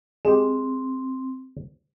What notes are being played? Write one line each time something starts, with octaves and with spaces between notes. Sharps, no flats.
G#3 C4 G4